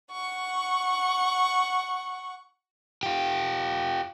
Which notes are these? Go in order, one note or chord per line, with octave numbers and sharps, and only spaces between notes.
F#5 C#6
F4 G4